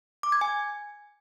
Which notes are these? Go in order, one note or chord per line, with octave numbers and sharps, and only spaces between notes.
D6
G#6
G#5